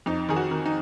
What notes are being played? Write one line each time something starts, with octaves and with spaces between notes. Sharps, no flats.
F2 D#4
D#3 G#4
F#4
D#3
D#4